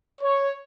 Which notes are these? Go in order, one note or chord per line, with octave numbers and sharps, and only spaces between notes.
C#5